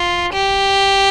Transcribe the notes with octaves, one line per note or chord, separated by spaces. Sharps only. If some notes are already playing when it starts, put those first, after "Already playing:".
Already playing: F4
G4